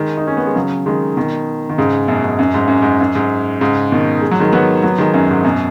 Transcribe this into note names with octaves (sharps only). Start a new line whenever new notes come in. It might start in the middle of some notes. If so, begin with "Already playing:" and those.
Already playing: D#3 G#3
D#4
C#4
B3
G#3
C#3 F#3
D#3 G#3
B2 D#3
D#3
G#2 C#3
F#2 B2
G#2
F#2
G#2
F#2
G#2
F#2
G#2
G#2 C#3
B2 D#3
G#3
F#3
D#3 G#3
F#3 B3
F#3 B3
D#3 G#3
F#2
G#2
F#2 B2